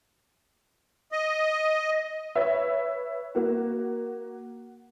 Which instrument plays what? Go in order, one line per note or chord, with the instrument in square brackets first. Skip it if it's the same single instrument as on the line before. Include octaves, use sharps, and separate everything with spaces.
[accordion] D#5
[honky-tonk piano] B4 C#5 E5
A#3 F#4